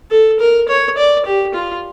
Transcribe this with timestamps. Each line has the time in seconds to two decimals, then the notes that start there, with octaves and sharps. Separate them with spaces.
0.11 A4
0.40 A#4
0.68 C#5
0.97 D5
1.25 G4
1.54 F4